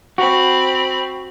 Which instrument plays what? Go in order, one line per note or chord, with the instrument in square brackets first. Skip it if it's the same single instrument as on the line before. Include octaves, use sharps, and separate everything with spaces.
[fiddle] C4 B5 [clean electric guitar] F#4